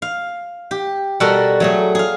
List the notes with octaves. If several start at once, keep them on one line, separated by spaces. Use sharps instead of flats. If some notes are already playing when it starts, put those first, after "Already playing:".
F5
G4
B2 G3 F#4 A4 A#4 F#5
F#3 A3 G#4
G#4 F5